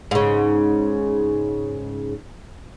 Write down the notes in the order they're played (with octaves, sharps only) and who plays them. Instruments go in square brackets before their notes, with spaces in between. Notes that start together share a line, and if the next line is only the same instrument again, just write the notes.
[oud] G#2 C#3